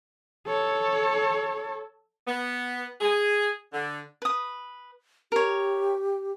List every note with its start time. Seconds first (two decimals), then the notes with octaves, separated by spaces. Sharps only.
0.47 A4 C#5
2.27 B3
3.01 G#4
3.72 D3
4.22 B4 D#6
5.32 G4 A#4 C#5